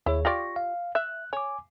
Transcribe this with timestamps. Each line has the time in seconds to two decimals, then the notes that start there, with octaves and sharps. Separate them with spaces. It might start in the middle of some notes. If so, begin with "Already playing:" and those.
0.06 D#2 E4 G#4 C#5
0.25 F4 G4 D5 C#6 A#6
0.56 F5
0.95 E5 F#6
1.33 C#5 G#5 D6